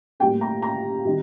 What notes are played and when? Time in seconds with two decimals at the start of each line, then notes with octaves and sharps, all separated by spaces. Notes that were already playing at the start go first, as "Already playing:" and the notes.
0.20 A2 G3 A#3 G5
0.41 A#5
0.62 A#5
1.05 D#3 G3 C4 D#4